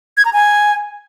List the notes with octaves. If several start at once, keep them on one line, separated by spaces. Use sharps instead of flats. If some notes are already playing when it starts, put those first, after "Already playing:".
G#6
A#5
G#5